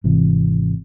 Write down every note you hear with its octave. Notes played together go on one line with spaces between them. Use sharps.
G#1 C3 E3